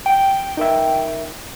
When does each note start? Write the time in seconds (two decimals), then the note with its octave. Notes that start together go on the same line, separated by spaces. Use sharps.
0.06 G5
0.57 D#4 A#4 E5